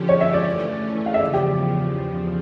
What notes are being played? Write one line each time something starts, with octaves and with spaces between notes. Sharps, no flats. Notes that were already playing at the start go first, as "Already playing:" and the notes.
Already playing: D3 F3 C#4 G4
C#5
E5
D5
E3 A3 C#4
F5
E5
E2 C#3 F3 D5
G4